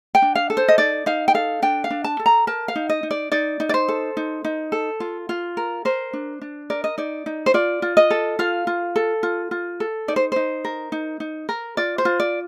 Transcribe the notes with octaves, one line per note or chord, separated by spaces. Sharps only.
G5
D4
F5
A4
C5
D#5
D#4 D5
D#4 F5
G5
A4 F5
D4 G5
F5
D4
A5
A4
A#5
A#4 A5
F5
D#4
D#5
D#4
D5
D#4 D5
D#4
D5
C5
A4
D#4
D#4
A4
F4
F4
A#4
A#4 C5
D4
D4
A#4 D5
D#5
D#4 D5
D#4
C5
F4 D5
F4
D#5
A4
F4 F5
F4
A4
F4
F4
A4
D#4 D5
C5
D#4 C5
A#4
D#4
D#4
A#4
F4 D5
C5
F4
D5